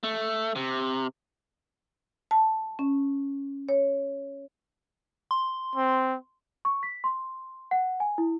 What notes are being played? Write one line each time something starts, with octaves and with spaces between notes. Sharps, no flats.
A3
C3
A5
C#4
C#5
C6
C4
C#6
B6
C6
F#5
G#5
E4